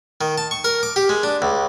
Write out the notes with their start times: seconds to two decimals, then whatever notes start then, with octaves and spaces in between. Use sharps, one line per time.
0.21 D#3
0.38 A5
0.51 C#6
0.64 A#4
0.83 D6
0.96 G4
1.09 G#3
1.23 D4
1.42 C#2